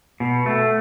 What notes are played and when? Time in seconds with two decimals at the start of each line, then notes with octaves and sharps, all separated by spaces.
0.20 B2
0.46 A3